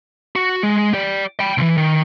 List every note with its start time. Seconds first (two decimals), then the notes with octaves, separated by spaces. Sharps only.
0.36 F#4
0.63 G#3
0.94 G4 D5
1.40 G5 B5
1.58 C#2 E3
1.77 D#3